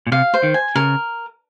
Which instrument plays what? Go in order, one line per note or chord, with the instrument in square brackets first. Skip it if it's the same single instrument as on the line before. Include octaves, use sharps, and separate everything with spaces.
[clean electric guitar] A#2
[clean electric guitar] C3 [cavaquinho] F5
[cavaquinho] C5
[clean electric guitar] D#3
[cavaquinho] G#5
[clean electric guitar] C#3 [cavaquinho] A#4